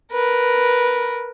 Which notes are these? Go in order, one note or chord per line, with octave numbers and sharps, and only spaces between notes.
A#4 B4